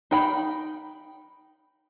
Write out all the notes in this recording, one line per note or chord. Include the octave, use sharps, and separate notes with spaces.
D#4 G5 B5